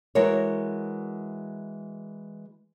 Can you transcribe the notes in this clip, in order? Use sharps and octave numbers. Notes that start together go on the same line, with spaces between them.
E3 G#3 F#4 A#4 C#5